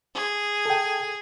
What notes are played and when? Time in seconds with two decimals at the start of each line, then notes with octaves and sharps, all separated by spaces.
0.15 G#4
0.66 A4 G5